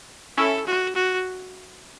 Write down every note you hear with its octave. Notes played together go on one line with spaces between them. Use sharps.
C#4 E4 A4
F#4
F#4